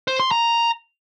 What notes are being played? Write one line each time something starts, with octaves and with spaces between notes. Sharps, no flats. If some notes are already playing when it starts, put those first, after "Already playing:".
C5
C6
A#5